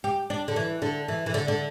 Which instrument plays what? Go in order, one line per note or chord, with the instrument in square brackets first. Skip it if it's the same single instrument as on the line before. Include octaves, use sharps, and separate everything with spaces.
[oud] G4
D4
D3
E3
D3
E3
E3
D3
D3